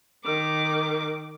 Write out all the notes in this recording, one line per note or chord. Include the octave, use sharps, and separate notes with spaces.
D#3 D6